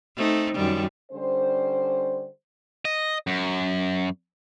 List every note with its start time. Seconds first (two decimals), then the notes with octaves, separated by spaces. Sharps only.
0.16 A3 C4 D#4
0.55 F#2 D#3 G3
1.12 D3 G3 C#4 C5
2.85 D#5
3.27 F#2